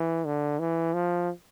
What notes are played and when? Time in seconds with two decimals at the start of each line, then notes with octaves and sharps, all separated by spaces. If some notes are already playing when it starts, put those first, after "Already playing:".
Already playing: E3
0.26 D3
0.59 E3
0.94 F3